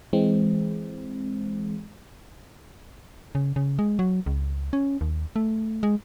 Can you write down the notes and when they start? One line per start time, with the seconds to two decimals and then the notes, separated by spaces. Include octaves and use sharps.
0.13 E3 G#3 C4
3.35 C#3
3.56 C#3
3.79 G#3
3.99 F#3
4.26 C#2
4.73 C#4
5.01 D#2
5.36 A3
5.83 G#3